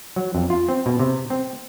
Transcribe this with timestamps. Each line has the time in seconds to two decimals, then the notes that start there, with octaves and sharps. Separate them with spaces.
0.16 F#3
0.35 F2
0.50 F4
0.69 C4
0.86 B2
1.00 C3
1.30 C4